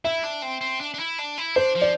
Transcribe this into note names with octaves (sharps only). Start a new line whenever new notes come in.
E4 E5
D4
C4
C4
D4
D4
E4
D4
E4
D4 C5
F3
D5